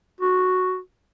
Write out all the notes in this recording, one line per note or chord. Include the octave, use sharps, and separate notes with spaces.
F#4